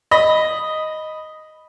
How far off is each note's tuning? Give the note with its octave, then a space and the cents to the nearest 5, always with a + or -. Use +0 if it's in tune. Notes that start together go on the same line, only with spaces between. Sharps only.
D#5 +0 B5 +0